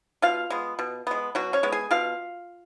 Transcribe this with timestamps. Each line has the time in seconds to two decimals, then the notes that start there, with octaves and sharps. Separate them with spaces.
0.22 B2 F4 F5
0.50 G#3 B3
0.79 B2
1.07 G#3 B3
1.35 B2 F#3 F#4
1.53 C#4 C#5
1.63 G#3 B3
1.72 G#4 G#5
1.91 B2 F4 F5